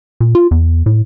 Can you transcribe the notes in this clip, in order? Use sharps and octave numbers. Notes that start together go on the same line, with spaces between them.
A#2
F4
E2
A2